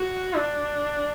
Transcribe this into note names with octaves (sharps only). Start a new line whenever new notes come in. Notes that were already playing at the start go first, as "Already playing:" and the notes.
Already playing: F#4
D4